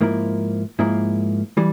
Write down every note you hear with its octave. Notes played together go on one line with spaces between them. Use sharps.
G#2 F3 A#3 E4 A#4
G#2 F3 A#3 E4 A#4
E3 G3